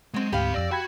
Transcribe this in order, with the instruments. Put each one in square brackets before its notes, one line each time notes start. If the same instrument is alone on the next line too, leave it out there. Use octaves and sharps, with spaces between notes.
[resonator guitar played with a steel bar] F#3 C4 [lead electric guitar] G#3
[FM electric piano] D2 G#2 [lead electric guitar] C4 B5 [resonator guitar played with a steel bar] G4 F5
[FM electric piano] F2 E6 A#6 [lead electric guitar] D5
[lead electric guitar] F#4 [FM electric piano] G5 B5 G#6